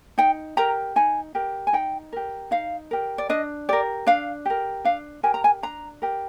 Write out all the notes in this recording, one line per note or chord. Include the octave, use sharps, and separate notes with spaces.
D#4 G5
G4 A#4 A#5
D#4 G#5
G4 A#4
G#5
D#4 G5
G4 A#4
D#4 F5
G4 A#4
D5
D4 D#5
G4 A#4 D5
D4 F5
G4 A#4
D4 F5
G4 A#4 G#5
A#5
G#5
D4 A#5
G4 A#4